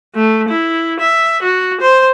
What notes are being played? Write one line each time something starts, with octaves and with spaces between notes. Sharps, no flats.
A3
E4
E5
F#4
C5